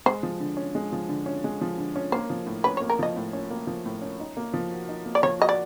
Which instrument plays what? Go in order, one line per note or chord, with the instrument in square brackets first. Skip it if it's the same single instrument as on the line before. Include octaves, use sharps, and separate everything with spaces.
[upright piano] G#3 [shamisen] C5
[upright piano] F3
D3
C#4
G#3
F3
D3
C#4
G#3
F3
D3
C#4
[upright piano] A#3 [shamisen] C5
[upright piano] F3
A2
[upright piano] C#4 [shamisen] B4
[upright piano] A#3 [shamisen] C#5
[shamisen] A#4
[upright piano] F3 [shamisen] D#5
[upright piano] A2
C#4
A#3
F3
A2
C#4
D#4
A#3
F3
F#4
D#4
A#3
[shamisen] D5
[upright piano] F3 [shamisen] C#5
[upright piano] F#4 [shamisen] D#5
[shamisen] D5